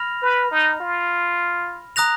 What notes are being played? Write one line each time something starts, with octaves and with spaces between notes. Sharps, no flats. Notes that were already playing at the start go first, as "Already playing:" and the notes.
Already playing: B5 F6 A#6 F7
B4
D#4
F4
A#5 D#6 F#6 A#6 F7